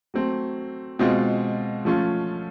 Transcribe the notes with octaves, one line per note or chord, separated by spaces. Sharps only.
F#3 A3 C4
B2 G#3 C4 F4
F3 A3 C#4 F4